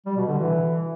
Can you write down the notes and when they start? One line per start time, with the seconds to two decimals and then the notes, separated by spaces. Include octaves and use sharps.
0.06 G3
0.17 B2
0.27 D3
0.38 E3